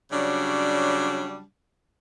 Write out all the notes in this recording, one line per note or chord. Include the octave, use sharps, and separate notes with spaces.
C#3 F#3 G3 D4